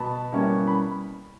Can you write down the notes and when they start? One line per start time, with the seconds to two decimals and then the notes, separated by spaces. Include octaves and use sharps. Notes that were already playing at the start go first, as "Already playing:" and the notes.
Already playing: B2 A5 B5
0.32 G3 A#3 C#4 E4
0.67 B5